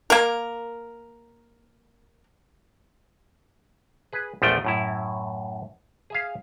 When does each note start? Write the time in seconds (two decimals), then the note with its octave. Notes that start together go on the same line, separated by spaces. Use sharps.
0.10 A#3 A#4
4.13 G#4 B4
4.42 A#1 E2 F3 A3 G5
4.65 F#2 A2 E4
6.10 G#4 E5 F5